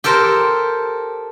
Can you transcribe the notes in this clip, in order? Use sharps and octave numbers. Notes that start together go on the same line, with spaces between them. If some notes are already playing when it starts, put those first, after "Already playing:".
G4 A4 A#4 C5